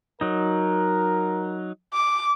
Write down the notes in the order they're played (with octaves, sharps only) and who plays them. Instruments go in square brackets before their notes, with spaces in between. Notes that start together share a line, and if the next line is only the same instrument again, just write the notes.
[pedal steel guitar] F#3 D#4 [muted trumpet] A#4
[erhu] D6